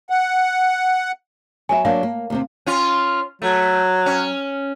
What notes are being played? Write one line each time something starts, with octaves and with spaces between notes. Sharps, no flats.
F#5
F#3 B3 E5 G#5
F#3 A#3 D4 F5
A#3
D#2 C3 C4
C#4 F4
F#3 A3
C#4